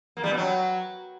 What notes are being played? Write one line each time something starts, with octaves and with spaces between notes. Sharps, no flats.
A#3
G3
B2
F#3